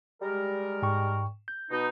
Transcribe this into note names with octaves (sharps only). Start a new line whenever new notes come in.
G3 G#3 A#4
G#2 G5 C#6
G6
B2 D#4